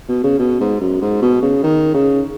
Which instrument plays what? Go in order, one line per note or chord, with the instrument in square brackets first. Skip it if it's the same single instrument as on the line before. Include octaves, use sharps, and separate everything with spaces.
[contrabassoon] B2
C#3
B2
G#2
F#2
G#2
B2
C#3
D#3
C#3